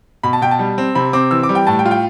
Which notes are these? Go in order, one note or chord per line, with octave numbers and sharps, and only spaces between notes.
B2 B5
A5
B2 G5
A5
G3
C4
C3 B5
C4 D6
E3 E6
D6
G3
G5
A2 A5
G5
F4
G5